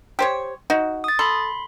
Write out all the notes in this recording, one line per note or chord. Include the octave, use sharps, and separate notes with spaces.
G4 C5 C#5
D#4 F#4
D#6 A6
A4 B5 C6